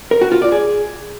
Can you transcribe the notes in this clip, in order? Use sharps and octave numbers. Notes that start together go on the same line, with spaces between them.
A#4
F#4
F4
D5
G#4